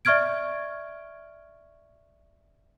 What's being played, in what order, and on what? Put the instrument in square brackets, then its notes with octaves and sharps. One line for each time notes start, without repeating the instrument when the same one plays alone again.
[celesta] D5 E5 C#6 F6 G#6 D7